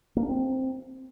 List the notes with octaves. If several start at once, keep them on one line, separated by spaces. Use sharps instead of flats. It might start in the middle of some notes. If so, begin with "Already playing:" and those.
A#3
D4
C4